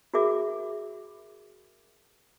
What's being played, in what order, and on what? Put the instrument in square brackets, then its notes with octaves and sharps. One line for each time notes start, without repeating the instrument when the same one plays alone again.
[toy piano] F#4 G#4 A#4 E5 D6